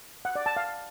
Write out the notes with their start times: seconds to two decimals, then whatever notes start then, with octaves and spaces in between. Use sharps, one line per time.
0.25 F#5
0.35 D5
0.46 A5
0.57 F5